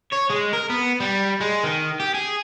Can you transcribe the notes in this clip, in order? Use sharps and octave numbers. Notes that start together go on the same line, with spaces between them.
C#5
G#3
A#4
B3
G3
G#3
D#3
G4
G#4